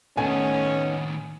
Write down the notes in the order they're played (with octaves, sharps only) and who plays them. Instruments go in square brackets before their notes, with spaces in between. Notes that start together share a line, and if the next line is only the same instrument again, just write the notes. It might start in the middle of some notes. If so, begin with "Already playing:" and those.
[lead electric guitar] A2 D#3 [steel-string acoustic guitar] A3 B3 D#4 [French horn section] C#4 [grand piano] G#5